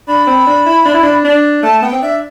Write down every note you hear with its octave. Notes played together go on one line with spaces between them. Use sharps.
D4 B5
C4
D4
E4
D4
E4
D4
D4
A3 A5
B3 G5
C4
D4 E5